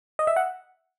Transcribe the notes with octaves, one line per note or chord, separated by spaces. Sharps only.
D#5
E5
F#5